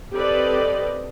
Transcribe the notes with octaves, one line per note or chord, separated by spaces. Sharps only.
C4 G4 A4 B4 D5 D#5